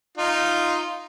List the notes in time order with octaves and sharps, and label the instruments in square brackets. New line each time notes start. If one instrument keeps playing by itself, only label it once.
[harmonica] D#4 F4